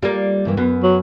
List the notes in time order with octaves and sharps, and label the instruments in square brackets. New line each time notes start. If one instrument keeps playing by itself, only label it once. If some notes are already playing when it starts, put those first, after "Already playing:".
[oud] G3 A#3 [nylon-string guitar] F4 D5
[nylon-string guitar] G2 E3 A#3
[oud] F#2 [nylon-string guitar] B3
[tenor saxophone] F#3